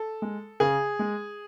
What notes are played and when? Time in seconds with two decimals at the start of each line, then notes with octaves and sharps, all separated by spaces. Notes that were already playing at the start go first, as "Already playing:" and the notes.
Already playing: A4
0.22 G#3
0.60 C#3 G#4
0.99 G#3